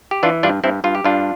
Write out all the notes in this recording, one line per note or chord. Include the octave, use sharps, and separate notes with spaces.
G4
E3 D4 F4
G2 D4 F4
G2 C4 E4
G2 F4
G4
G2 D4 F4